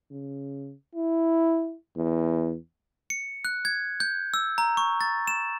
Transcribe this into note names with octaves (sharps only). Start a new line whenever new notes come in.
C#3
E4
E2
C#7
F#6
G#6
G6
E6
A#5
C#6
A6
E7